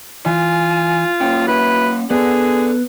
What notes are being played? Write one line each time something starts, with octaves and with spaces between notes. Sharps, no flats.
E3 F4 G#5
A#3 C#4 G5
E4 F#4 B4
B3 G#4 A4 D5